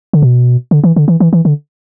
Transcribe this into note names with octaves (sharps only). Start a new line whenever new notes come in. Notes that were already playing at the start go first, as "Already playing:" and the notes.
D3
B2
D3
E3
D3
E3
E3
E3
D3